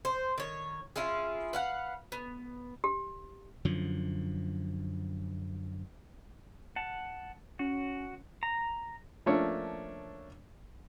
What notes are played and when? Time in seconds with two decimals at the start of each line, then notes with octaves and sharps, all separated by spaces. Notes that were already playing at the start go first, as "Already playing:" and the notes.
0.05 C5
0.38 D#3 C#5
0.96 C#4 E4 F4 G#4
1.53 B4 F5 F#5
2.12 B3
2.84 G4
3.65 F#2 D3 F3
6.76 F#5 A5
7.59 C#4 F#4
8.43 A#5
9.26 F3 A3 A#3 C#4 D4 C#5